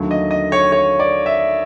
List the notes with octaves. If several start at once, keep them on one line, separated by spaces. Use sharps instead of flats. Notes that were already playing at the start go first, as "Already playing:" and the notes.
Already playing: D#2 D3 F#3 A3
D#5
D#5
C#5
C#5
D5
E5